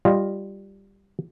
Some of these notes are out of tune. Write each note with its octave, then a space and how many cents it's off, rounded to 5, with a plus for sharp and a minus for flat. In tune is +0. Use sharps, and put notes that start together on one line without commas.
G3 +0 F4 +0 D#5 -5